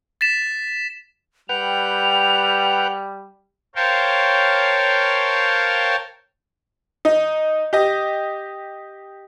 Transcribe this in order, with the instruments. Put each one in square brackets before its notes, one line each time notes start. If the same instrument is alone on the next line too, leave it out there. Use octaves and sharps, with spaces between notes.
[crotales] A6 B6 E7
[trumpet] G3 [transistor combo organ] B4 F#5 G5 [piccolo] F7
[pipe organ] A#4 C5 C#5 F5 G5 A5
[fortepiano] D#4
G4 D#5